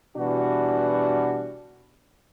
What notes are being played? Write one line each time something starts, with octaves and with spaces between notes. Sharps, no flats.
B2 E3 G3 D4 F#4